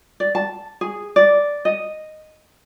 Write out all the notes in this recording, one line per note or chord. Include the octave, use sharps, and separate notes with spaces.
D5
A5
G#4
D5
D#5